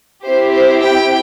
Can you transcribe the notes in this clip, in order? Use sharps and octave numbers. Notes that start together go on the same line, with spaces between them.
C4 E4 G4 C5
C5
G5